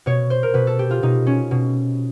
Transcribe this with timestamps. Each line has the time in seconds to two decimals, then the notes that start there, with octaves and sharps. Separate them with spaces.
0.06 B2 C#5
0.30 C5
0.43 A#4
0.54 B2 B4
0.67 A4
0.79 G4
0.91 F4
1.03 B2 D#4
1.27 C#4
1.51 B2